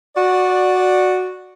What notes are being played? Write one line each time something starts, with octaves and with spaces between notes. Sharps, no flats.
F#4 D5